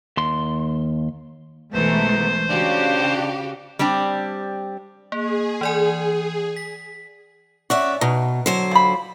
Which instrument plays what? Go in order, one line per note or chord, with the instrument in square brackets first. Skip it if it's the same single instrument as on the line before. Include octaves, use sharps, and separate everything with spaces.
[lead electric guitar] D#2 C6
[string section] B1 A#4 [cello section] E3 G#3 A3 [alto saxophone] B3 [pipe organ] C5
[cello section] C#3 [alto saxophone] D4 [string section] F#4 G4 F5
[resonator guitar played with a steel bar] G3 C4 D4 G4
[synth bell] A#3 [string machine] G#4
[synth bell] E3 D5 G#5
B6
[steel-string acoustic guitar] C#4 D5 E5 [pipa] F#4
[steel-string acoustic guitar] B2 [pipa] D#4
[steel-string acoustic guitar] D3 F#3 C5
[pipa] F3 B5